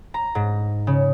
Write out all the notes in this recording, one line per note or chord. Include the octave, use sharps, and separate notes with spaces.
A#5
G#2
C#3